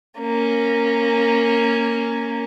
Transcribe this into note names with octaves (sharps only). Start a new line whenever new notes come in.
A#3 C#4